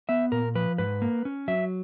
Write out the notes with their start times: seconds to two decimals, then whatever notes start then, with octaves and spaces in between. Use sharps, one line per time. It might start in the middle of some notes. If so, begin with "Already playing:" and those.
0.09 B3 E5
0.32 A#2 A#4
0.55 F3 B4
0.78 G#2 B4
1.02 A#3
1.25 C#4
1.48 F#3 E5